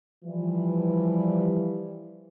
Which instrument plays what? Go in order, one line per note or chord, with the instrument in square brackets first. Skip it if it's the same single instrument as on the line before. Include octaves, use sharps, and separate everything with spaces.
[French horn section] E3 F3 G3